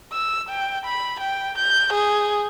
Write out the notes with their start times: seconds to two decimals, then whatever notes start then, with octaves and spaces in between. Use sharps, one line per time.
0.12 E6
0.50 G5
0.86 B5
1.20 G5
1.58 G6
1.93 G#4